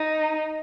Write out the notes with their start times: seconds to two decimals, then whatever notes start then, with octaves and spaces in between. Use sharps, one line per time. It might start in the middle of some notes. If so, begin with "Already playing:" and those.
Already playing: D#4